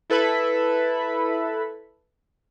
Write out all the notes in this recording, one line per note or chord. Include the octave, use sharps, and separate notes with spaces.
E4 A4 B4 E5 B5